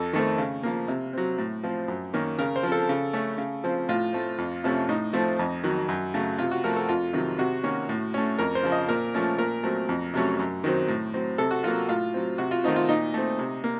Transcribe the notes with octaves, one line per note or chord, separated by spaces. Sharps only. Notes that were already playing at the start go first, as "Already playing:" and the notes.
Already playing: F2 A4
D#3 A3 C4
C#3
F3 A#3
C3
F#3 C4
A2
F3 C4
F#2
D#3 A#3 C#4
C#3 A#4
C5
F3 C4
A4
C#3
A3 C#4
C#3
F3 C4
A2 F4
A3 C4
F2
C3 F3 A3 C#4
A2 D#4
F3 A3 C4
F2
D#3 F#3
F#2
C#3 F#3 A3
C3 F4
F#4
F3 A3 A#4
A4
F2 F4
C3 D#3 F#3
C3 F#4
D#3 A#3 C#4
A2
A3 C#4
F2 A#4
C5
C#3 F3 C4
D#5
A#2 A#4
F3 A3 C#4
A#2 A#4
F#3 A3 C4
F2
C3 F#3 A3 C#4
F#2
D#3 F#3 C4
A2
F#3 C4
C3 A4
F#4
F#3 A#3 F4
A2 F4
F#3 C4
C3 F#4
F4
D#3 A3 C4 D#4
F4
A#2 D#4
A3 C4
C3
A#3